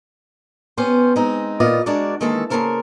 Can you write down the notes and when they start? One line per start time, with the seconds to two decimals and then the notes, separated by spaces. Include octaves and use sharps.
0.78 B3 C#4 G4 C5
1.16 G#3 C4 D#4
1.60 A#2 D#3 B3 F4 D5 D#5
1.86 G#3 D4 F#4 A#4 D5
2.21 D#3 E3 G#3 A#3 A4 A5
2.50 C#3 A3 A#3 A4 A#4 C5